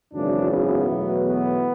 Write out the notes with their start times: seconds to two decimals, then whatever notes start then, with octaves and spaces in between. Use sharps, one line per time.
0.13 G#1 F#2 C#3 E3 D4
0.50 B3
0.87 E2 B2 F#3 A3
1.23 B3